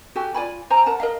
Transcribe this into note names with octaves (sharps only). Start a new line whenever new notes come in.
F#4 G4 A4 G#5
F4 D5 G#5 B5
C5 G#5 A#5
A#4 F#5 A5 A#5
A#4 D#5 F5